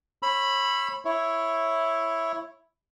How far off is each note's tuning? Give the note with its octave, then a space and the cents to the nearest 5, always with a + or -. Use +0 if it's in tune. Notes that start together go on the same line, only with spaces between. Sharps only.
C#5 -35 B5 +0 E6 +25
E4 +0 C#5 -10